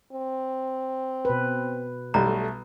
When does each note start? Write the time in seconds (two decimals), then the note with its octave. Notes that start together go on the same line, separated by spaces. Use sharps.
0.12 C4
1.25 B2 B4
2.14 B1 G3 A3 A#5